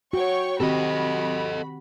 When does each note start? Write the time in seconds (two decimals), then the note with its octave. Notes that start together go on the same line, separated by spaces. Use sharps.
0.13 F#4 C#5 G5 C#6
0.60 D#3 C4 F#4 G4 A4 D#5 B5